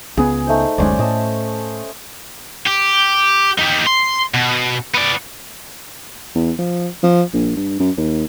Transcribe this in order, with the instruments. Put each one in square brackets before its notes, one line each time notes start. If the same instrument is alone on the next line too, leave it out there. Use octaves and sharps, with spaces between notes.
[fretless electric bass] C#2 B3 [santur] G#4
[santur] A3 D#4 C5
[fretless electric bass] F#1 D2 G#3 [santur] C#4 C5 D5
[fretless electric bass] A2 [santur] D#5 A5
[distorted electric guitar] G4
D#4 G4
C6
B2
B3 D5
[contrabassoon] E2
F3
F3
A#1
G2
F#2
D#2